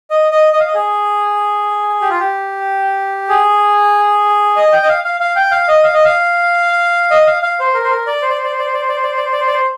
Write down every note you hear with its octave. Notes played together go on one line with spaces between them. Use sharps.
D#5
D#5
D#5
F5
D#5
G#4
G4
F4
G4
G#4
D#5
G5
D#5
F5
F5
F5
G5
F5
D#5
F5
D#5
F5
D#5
F5
F5
C5
A#4
C5
A#4
D5
C5
D5
C5
D5
C5
D5
C5
D5
C5
D5
C5
D5
C5
D5
C5
D5
C5
D5
C5